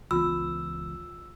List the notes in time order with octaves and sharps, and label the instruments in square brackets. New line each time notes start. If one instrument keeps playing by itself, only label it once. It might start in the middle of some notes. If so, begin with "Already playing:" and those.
[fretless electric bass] C#2 E3 B3 [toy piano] F4 [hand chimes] E6